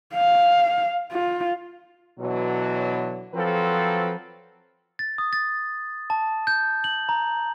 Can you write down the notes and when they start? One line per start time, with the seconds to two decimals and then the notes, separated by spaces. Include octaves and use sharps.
0.14 F5
1.12 F4
2.19 B2 D3 E3 F#3
3.33 F3 F#3 C4 A4 B4
4.99 A6
5.18 D#6
5.33 A6
6.10 A5
6.47 G6
6.84 F#7
7.09 A#5